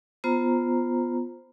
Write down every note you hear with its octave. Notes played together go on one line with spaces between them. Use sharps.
B3 F4 C5 A#5